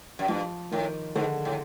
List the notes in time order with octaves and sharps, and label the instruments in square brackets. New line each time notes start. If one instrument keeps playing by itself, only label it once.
[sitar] F#2
[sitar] G2 [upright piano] F3
[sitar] A2 [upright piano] D#3
[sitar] G#2 [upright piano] D3
[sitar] A2